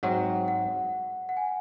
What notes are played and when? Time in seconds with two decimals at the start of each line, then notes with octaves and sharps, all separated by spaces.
0.03 G#2 F#3 C4 F#4 F#5
0.48 F#5
1.29 F#5
1.37 G#5